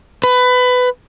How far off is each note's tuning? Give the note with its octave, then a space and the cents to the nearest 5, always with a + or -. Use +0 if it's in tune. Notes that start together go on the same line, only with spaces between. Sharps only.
B4 +20